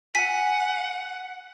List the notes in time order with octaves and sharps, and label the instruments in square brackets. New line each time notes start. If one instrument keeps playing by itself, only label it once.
[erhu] F#5 [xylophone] G#5 B6